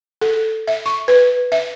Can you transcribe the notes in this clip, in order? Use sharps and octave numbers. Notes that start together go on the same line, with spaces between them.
A4
E5
C#6
B4
E5